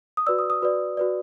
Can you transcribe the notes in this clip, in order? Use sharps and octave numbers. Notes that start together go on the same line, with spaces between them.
D#6
F#4 B4 D5 E6
D#6
D#6
F#4 B4 D5
F#4 B4 D5